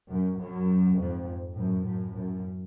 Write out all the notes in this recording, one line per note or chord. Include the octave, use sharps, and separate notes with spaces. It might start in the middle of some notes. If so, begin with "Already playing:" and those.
F#2
F#2
F2 G#2
F#2 A2
F#2 A2
F#2